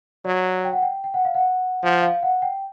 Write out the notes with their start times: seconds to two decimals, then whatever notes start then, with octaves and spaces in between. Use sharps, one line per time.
0.25 F#3 D5
0.64 G5
0.73 F#5
0.82 G5
1.04 G5
1.14 F#5
1.25 F5
1.35 F#5
1.83 F3 F#5
2.02 F5
2.23 F#5
2.42 G5